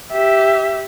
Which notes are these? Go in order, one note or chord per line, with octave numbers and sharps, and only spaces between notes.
G4 E5